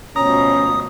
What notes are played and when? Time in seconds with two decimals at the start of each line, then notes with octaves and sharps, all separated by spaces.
0.16 D2 B2 F3 C#4 A#5 D#6